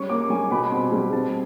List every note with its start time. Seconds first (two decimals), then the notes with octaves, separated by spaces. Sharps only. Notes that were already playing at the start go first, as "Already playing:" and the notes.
Already playing: G3 C#4 C#6
0.09 A#3 D6
0.30 G3 G#5
0.51 B2 B5
0.71 C4 C6
0.92 G3
1.13 C4 A5